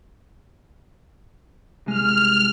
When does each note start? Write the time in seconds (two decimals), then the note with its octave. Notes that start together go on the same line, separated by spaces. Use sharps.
1.86 C2 G#3 F6